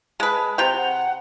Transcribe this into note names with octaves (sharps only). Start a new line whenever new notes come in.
G#3 B4 A5
C3 G5 F7
F#5